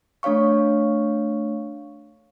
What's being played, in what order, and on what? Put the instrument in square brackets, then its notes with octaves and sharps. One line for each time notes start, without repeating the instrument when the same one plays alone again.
[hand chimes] A3 D4 C#5 F5 C#6